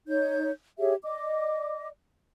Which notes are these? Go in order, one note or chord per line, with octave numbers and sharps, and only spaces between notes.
D#4 C#5 G6
G4 G#4 C#5 E5
D5 D#5 D6